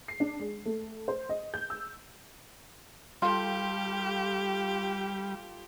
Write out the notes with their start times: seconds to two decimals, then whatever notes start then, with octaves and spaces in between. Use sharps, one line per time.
0.08 C7
0.20 D4
0.39 G#3
0.66 A3
1.08 C5
1.29 D#5
1.54 G6
1.70 E6
3.22 G3 F4 G4 A4